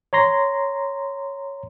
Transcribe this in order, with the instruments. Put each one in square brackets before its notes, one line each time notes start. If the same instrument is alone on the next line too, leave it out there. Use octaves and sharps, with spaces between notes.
[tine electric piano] C#5 A#5 C6 A#6